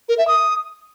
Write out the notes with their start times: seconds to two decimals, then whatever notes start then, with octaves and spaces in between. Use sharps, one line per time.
0.09 A#4
0.18 E5
0.28 D#6